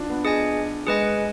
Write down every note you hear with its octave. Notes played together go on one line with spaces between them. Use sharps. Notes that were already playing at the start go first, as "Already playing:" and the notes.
Already playing: D4 F4
B3
G#4 D#5 G#5
G#3 G#4 B4 D#5 G#5